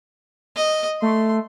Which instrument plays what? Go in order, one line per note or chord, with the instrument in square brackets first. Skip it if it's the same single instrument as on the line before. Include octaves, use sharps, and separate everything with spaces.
[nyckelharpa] D#5
[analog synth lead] A3 [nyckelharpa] C6